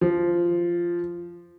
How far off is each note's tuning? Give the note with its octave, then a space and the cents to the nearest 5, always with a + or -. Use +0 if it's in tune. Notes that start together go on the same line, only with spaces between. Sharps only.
F3 -10